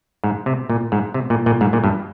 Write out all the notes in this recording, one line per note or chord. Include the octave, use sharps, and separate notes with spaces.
G#2
C3
A#2
G#2
C3
A#2
A#2
G#2
A#2
G2